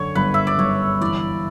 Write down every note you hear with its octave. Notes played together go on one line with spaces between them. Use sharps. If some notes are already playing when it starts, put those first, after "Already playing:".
Already playing: F#2 D3 C#5
G1 B4
E5
D5
G1 C#5
E3 D5